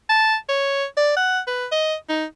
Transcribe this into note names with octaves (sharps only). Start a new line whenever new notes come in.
A5
C#5
D5
F#5
B4
D#5
D#4